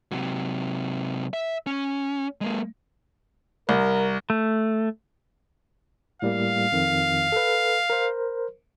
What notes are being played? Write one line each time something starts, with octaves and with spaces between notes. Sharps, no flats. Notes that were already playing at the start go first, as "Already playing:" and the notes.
C3 F#3
E5
C#4
G#3 A#3
C2 A#4
A3
A2 G3 A#3 F5
F2 D#3
A4 B4
A#4 C5